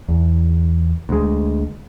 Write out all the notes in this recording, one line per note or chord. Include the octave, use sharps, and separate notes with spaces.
E2
D2 G#3